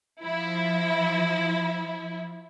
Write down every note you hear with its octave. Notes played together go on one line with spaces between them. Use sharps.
F3 E4